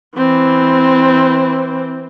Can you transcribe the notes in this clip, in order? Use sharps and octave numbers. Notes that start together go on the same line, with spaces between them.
E3 C4